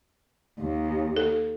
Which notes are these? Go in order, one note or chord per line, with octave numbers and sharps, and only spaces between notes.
D#2
A4